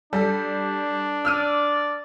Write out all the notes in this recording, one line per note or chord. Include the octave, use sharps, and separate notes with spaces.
G3 D4 A4
D5 E6 F6 D#7